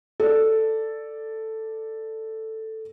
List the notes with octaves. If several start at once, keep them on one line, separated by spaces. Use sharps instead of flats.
A4 D5